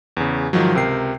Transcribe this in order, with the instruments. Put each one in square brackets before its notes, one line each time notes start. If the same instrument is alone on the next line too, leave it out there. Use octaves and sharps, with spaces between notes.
[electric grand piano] E2 C#3
G#2 D#3 F3 F#3
C#2 C3 A#4 G5 C7